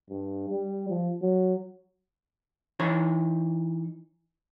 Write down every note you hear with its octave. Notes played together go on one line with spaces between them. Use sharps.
G2
G3
F3
F#3
E3 D#4 C#5